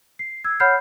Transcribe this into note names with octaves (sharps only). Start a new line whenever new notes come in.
C7
E6 G#6
C#5 F#5 B5 F6 G6 C7